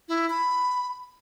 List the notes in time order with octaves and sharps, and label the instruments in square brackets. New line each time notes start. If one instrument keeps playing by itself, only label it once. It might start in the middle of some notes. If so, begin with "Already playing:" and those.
[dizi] E4
B5